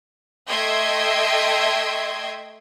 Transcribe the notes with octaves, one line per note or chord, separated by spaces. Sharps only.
A3 D#5 E5 G5 C6 G#6